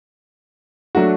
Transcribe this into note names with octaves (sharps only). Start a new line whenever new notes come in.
F#3 A3 D4 F#4